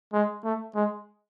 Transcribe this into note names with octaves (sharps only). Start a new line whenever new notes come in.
G#3
A3
G#3